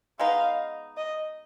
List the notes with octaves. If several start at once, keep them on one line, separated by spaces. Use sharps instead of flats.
G#3 B3 D#4 F5
D#5